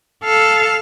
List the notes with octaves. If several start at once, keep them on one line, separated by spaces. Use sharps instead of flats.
A4 F5